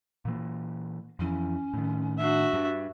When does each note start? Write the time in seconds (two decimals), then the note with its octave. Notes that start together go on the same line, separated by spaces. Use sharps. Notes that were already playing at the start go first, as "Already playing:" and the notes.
0.25 A#2 E3 A#3
1.19 F2 E3 C#4
1.74 A2 D#3
2.18 D4 F#4 E5
2.53 G2